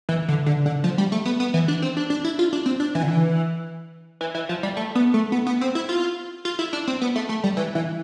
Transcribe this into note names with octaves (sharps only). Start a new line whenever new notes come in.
E3
D3
D3
D3
F3
G3
A3
B3
B3
E3
D4
C4
D4
D4
E4
F4
D4
C4
D4
E3
D3
E3
E3
E3
F3
G3
A3
B3
A3
B3
B3
C4
E4
F4
F4
E4
D4
C4
B3
A3
A3
G3
E3
E3